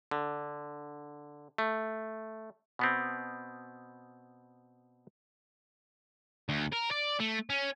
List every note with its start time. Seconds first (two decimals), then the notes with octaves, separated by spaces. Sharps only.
0.11 D3
1.58 A3
2.79 B2 B3 C4
6.49 D2
6.73 A#4
6.91 D5
7.20 A3
7.50 C#4